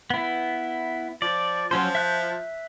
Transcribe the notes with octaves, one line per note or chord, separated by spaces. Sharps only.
B3 E4
F3 D5
F3 F#3 C#4 C5
E5 F#6 G6